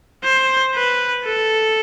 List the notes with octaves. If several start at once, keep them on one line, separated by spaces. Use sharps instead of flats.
C5
B4
A4